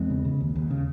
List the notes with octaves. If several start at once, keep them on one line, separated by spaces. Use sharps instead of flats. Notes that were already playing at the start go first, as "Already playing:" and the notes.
Already playing: E2 G#3 C4
C#3
C#3
D#2
D#2
C#3